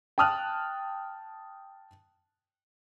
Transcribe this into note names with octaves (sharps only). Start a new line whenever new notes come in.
G5 A5 D#6 F6 F#6